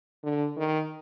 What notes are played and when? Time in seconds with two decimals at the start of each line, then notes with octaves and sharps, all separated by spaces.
0.23 D3
0.57 D#3